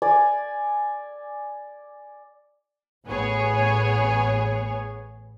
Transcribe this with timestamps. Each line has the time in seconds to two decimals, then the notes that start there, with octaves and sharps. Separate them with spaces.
0.02 D5 G#5
3.07 A1 B3 G#4 C#5